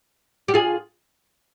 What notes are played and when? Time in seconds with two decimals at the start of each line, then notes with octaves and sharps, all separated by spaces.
0.48 G4
0.54 F4 G#4